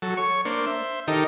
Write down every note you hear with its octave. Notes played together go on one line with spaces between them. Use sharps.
F#3 A4
C#5 C#6
A#3 D4 C5
C5 E5
D#3 D#4 G4 A4 A#4